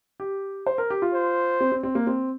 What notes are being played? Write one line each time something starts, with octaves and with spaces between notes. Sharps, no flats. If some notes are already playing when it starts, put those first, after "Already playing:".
G4
C5
A#4
G4
F4
C5
C4
C4
C4
A#3
C4